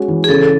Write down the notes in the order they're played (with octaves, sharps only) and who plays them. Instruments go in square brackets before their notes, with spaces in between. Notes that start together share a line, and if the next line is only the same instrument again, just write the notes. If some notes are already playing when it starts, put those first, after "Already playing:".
Already playing: [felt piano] G#3 C#4 F#4
E3
[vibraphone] G#4
[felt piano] C#3 [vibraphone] A4